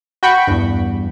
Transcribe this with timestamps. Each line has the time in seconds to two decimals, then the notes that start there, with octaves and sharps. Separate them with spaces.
0.23 F#4 G5 B5 C#6
0.47 E2 G2